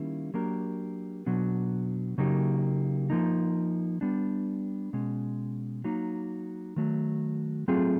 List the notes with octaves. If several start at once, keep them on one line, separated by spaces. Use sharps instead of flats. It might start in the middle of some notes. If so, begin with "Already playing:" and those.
Already playing: D#3 G3 A#3 C#4 E4
F#3 A#3 D4 G4 A#4
B2 F#3 B3 D4
C#3 F#3 A#3 D#4 G4
F3 A#3 D#4
G3 B3 D4
B2 G#3 C#4
F#3 A#3 D#4
D#3 F#3 A3
F#3 A3 C4 F4 G#4